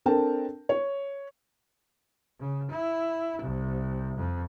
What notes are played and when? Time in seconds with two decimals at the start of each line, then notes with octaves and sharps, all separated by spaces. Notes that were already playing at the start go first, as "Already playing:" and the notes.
0.06 C4 D4 A4 A#4 G5 A5
0.69 C#5
2.40 C#3
2.70 E4
3.42 C2
4.16 F2